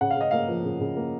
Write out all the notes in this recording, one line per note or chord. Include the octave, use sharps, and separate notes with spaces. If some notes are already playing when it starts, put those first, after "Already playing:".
C#3 F#5
F5
C#3 D#5
A#3 F5
F3
C#3
C#3
A#3